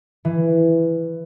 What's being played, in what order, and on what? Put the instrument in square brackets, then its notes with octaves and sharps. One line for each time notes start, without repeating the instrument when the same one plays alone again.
[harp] E3